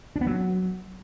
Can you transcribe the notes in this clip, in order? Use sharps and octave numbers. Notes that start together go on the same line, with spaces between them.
D4
B3
F#3